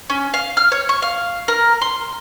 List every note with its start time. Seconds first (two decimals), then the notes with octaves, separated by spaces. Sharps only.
0.10 C#4
0.34 F5
0.57 F6
0.72 C#5
0.89 C#6
1.02 F5
1.48 A#4
1.82 C6